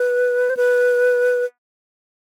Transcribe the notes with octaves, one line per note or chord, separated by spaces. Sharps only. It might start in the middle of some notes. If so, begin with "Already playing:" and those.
Already playing: B4
C5
B4